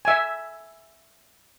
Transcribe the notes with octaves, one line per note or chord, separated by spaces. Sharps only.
E5 G#5